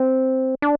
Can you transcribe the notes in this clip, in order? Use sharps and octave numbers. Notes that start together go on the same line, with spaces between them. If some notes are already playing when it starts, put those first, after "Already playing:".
Already playing: C4
D4